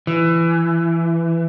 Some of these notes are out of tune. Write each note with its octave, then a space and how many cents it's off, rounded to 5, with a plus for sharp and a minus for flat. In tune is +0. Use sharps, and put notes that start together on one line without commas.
E3 +20